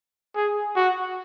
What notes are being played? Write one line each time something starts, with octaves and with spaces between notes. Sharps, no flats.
G#4
F#4